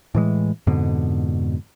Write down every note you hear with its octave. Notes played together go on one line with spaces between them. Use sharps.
A2 E3 G#3
F2 G#2 B2 D3